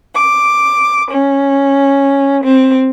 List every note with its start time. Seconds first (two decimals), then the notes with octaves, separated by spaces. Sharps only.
0.14 D6
1.10 C#4
2.43 C4